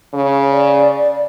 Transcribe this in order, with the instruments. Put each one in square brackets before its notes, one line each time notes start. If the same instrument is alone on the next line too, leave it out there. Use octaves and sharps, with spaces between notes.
[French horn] C#3 [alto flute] C#5
[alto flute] D5